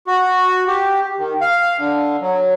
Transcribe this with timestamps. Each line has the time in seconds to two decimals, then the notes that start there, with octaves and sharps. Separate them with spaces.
0.07 F#4
0.68 G4
1.19 D#3
1.41 F5
1.78 D3
2.21 F#3